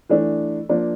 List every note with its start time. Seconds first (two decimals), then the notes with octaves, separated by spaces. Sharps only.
0.09 E3 A3 D4
0.69 F3 A#3 D4